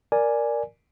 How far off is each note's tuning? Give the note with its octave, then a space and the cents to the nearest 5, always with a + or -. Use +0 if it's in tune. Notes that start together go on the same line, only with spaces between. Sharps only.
A#4 +0 D5 +0 G#5 +0